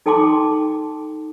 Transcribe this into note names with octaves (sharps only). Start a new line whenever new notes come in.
D#4 A4 G5 A5 C6 D6